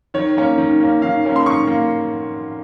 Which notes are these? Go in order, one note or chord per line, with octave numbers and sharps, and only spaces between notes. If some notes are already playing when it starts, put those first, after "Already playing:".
D#3 C#5
A#3 C#4
D#3
A#3 C#4
D#3 F5
A#3 C#4
C6
D#3 C#6
A#3